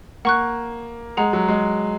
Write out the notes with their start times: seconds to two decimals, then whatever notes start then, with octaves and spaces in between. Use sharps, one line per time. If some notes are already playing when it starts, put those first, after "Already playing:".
0.25 A#3 F#5 C#6 F#6
1.17 G#3 G#4 F#5 A#5
1.33 F#3
1.48 G#3